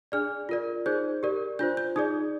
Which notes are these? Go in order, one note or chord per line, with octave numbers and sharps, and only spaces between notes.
D4 G#4 D5 F6
F4 A#4 D5
D#4 G#4 C5 G6
G4 A#4 D5
D4 F4 C5 G6
G6
D#4 G#4 D5 D#6